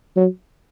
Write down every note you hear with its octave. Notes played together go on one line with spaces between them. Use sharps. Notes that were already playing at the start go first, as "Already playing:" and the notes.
F#3